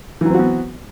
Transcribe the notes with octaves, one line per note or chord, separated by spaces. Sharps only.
E3 F#3 B3 C4 F#4